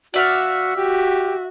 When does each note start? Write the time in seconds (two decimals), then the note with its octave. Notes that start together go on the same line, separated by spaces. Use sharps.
0.14 F#4 D5 E5 F5
0.76 F#4 G4